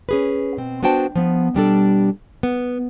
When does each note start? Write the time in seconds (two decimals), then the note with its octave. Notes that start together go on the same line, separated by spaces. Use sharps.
0.09 C#4 G#4 B4
0.57 B2 C4
0.83 B3 D4 F#4 C5 G5 A5
1.15 F3 B3
1.54 B2 G3 D4 A4
2.43 B3